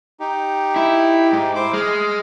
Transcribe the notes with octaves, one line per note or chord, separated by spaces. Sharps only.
D#4 G4
E4
G#2
E4 C5 D6
G#3 D#5 F6